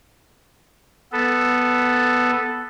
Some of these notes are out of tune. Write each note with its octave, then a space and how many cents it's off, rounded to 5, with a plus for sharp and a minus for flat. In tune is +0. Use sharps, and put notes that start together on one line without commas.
B3 +0 A4 +0